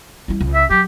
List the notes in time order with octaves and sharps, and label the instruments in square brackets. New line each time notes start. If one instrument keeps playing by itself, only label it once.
[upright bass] G3 E4
C#2
[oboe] E5
[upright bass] F#3 [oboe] G4